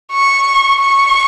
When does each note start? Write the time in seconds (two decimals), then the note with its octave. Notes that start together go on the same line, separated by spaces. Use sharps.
0.12 C#6
0.80 C#6